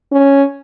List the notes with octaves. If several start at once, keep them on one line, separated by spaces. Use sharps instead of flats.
C#4